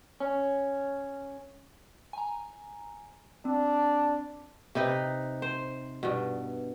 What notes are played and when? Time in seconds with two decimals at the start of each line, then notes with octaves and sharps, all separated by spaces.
0.20 C#4
2.13 G#5 A#5
3.45 C4 D4
4.75 C3 D#4 B4
5.42 C5
6.03 G2 B2